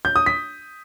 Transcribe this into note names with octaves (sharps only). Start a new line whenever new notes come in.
G6
D#6
B6